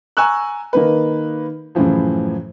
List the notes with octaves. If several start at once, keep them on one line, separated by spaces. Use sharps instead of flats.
G#5 A#5 C#6 E6 F#6
D#3 A#3 B4
F#2 A2 C#3 E3 F3